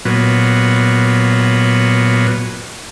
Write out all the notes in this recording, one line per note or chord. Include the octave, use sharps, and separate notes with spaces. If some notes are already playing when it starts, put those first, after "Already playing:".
A#2 F#3 B3